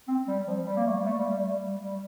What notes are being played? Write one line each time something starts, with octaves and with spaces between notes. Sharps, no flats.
C4
G3
F3
G3
A#3
A3
G3
A3
G3
G3
G3
G3